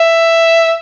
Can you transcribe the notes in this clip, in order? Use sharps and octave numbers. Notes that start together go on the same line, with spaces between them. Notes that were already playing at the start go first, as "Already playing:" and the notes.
Already playing: E5